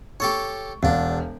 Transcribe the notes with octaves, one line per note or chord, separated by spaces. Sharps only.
G4 A4 C#5 C#6
E1 E2 D4 F5